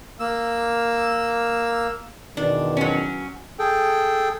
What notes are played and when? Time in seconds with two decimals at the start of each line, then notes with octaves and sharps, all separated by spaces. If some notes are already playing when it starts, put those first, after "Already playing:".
0.20 A#3 E6
2.37 E2 B2 D#3 D4
2.77 F#3 C#4
3.59 G#4 A4 G5